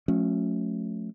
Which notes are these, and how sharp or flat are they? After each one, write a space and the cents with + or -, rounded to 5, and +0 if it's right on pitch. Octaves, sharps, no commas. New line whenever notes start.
F3 +45 A3 -10 C#4 +0